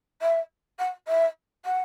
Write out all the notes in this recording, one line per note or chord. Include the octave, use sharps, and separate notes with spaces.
E5
F#5
E5
F#5